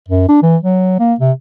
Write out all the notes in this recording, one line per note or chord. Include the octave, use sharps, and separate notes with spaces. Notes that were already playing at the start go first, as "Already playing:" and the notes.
F#2
D4
E3
F#3
A#3
C3